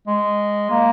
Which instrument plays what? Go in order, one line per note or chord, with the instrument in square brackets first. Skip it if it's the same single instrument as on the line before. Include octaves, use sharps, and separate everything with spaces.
[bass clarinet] G#3
A#3